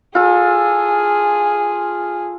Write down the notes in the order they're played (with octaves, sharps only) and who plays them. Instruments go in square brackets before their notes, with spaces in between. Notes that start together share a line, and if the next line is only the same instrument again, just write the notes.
[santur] F4 A4 [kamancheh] G#4